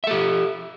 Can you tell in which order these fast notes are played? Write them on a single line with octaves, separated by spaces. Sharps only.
E5 A4 G4